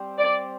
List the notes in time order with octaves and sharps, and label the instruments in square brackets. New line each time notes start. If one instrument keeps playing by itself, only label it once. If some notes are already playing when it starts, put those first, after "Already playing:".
Already playing: [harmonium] G3 C4 G4 C5
[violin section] D5